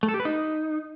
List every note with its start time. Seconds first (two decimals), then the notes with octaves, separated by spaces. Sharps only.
0.03 A3
0.08 A4
0.14 G4
0.20 B4
0.25 D#4